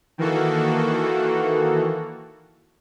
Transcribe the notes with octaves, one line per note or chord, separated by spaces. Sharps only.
D#3 E3 A#3 F#4 A4